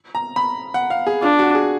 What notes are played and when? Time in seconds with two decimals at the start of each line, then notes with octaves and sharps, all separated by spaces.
0.15 A#5
0.36 B5
0.74 F#5
0.90 F5
1.07 G#4
1.22 D4 F4
1.39 F#4
1.55 G#4